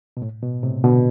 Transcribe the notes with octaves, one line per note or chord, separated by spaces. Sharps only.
B2
A2
B2
A2 C3
B2 D3